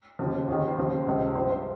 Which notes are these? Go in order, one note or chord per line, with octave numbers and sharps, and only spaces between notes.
D#2 C#3 F3
D#2 D#3 G#4
C5
D#2 C#3 F3
C#2 C3 F3
G2 F3 C5
C5